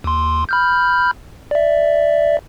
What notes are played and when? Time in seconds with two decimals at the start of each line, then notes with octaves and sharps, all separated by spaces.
0.04 D#2 C6
0.49 B5 F6 G6
1.51 D5 E5